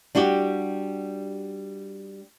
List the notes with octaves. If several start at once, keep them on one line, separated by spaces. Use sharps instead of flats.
G3 D4 F#4 G4